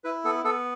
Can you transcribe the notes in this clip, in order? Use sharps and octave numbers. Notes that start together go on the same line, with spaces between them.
E4 B4
B3 A4
B3 A4